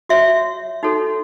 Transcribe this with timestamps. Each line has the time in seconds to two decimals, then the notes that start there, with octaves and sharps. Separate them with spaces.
0.09 F#4 C#5 E5
0.83 D#4 F#4 A4 C#5